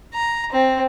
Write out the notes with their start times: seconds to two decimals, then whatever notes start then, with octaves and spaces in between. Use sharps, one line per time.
0.14 A#5
0.52 C4